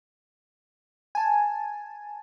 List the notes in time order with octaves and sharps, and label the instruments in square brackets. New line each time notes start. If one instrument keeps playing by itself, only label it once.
[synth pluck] G#5 A5